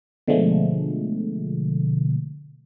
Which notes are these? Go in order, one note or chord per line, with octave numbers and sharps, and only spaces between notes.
B2 D3 F3 G#3 A3